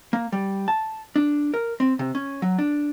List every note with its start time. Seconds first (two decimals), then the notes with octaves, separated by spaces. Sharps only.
0.13 A#3
0.32 G3
0.68 A5
1.16 D4
1.54 A#4
1.80 C4
1.99 C3
2.15 C#4
2.42 F#3
2.58 D4